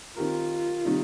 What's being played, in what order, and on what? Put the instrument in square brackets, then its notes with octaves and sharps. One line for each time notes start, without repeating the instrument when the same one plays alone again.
[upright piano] D#3 C4 G4 A#4 [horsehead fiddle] F4
[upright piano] C3 D#3 G3 D#4